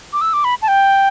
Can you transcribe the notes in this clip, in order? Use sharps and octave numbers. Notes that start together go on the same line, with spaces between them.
D6
E6
D6
B5
A5
G5